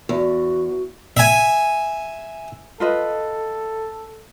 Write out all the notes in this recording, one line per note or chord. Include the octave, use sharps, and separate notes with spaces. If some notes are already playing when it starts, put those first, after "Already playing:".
E2 F#4
E5 G#5
F4 A4 B4 D#5